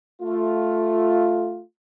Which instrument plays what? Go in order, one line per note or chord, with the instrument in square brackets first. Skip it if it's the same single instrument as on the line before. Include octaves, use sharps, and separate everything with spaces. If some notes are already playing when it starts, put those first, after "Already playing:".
[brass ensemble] A3 F4